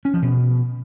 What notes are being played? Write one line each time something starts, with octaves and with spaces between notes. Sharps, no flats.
C#4
F3
B2